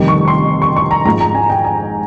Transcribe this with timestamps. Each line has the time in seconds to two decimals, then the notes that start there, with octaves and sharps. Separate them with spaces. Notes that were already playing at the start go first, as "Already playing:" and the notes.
Already playing: F1 F2 D#3 G3
0.08 C#6
0.28 C6
0.62 C#6
0.76 C#6
0.91 A#5
1.05 G#2 F3 G#3 A#5
1.20 A#5
1.35 G#5
1.50 G5
1.64 G#5